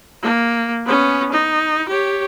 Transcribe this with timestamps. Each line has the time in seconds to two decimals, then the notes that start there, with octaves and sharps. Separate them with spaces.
0.23 A#3
0.85 B3 C#4
1.32 D#4
1.89 G4 C#5